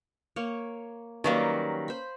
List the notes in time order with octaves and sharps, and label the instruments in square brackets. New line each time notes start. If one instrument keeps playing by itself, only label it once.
[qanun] A#3 C#5
[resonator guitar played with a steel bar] D#3 F#3 G3 [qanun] A#3 C#4 B4
[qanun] C5 B5